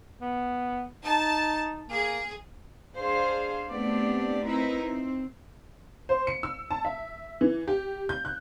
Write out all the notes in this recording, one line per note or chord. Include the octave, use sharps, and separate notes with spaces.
B3
D#4 A5
A#3 G#4
D4 G#4 C5 F5
A3 B3 C4 D4 G4 D5
C4 D#4 E4 A#4 B4
C4
C5
C#7
E6
A5
E5
E3
G4
G6
F#6